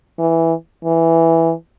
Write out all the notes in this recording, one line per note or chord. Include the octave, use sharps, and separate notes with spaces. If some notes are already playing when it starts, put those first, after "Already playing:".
E3
E3